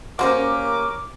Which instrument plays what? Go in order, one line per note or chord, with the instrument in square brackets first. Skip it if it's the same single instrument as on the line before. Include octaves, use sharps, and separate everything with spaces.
[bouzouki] A#3 C#4 G4 [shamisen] F#4 C5 [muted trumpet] A#4 [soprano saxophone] D6